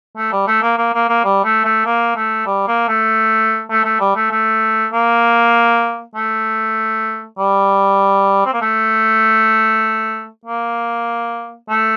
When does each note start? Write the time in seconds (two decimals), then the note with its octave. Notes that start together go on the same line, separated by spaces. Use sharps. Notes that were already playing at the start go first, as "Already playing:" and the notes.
0.17 A3
0.33 G3
0.48 A3
0.62 A#3
0.78 A#3
0.94 A#3
1.09 A#3
1.24 G3
1.45 A3
1.65 A3
1.86 A#3
2.16 A3
2.47 G3
2.68 A#3
2.88 A3
3.71 A3
3.85 A3
4.00 G3
4.16 A3
4.31 A3
4.93 A#3
6.15 A3
7.39 G3
8.45 C4
8.53 A#3
8.62 A3
10.46 A#3
11.70 A3